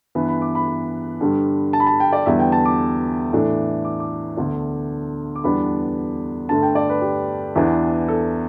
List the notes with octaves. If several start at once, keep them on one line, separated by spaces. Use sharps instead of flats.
G2 E3 B3 B4
B5
D6
B5
G2 D3 G3
A5
B5
A5
G5
D5
E2 D3 G3 B3 E5
G5
A5
D6
A2 E3 A3 D4
D6
D6
D2 D3 B3 D4
D6
E2 D3 G3 B3 D4 B5
G2 D3 A3 A5
G5
D5
B4
G4
E2 E3 B3 D4
A4